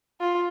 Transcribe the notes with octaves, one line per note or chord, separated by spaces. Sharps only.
F4